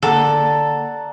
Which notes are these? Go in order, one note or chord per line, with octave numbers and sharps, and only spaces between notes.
D3 A#3 A4 D5 F#5 A#5